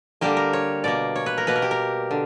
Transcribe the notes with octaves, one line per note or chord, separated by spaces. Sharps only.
D3 G3 A#3 G4
A#4
C#5
B2 A#3 D5
C#5
B4
A#4
B2 A#3 B4
A#4
G4
A#4
D3